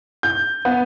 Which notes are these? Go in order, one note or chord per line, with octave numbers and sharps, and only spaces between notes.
G6
B3